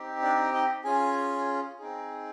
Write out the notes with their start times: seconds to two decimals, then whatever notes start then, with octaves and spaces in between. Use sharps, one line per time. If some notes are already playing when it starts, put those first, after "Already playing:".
Already playing: C4 D#4 G4
0.22 D4 D5
0.54 D#4 D#5
0.85 C#4 F4 G#4 G#5
1.79 C4 D#4 G#4